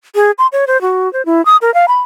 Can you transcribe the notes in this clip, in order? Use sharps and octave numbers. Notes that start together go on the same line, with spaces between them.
G#4
C6
C#5
C5
F#4
C5
E4
D#6
A#4
F5
B5